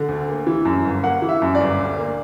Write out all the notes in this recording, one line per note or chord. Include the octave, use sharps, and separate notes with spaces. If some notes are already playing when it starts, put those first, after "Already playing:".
Already playing: D3
D2
A#3
E3
F#2
G1
A#3 F#5
E3
E5
F#2
D5
G1
D2
A#3